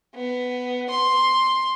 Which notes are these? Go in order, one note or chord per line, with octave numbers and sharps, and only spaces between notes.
B3
C6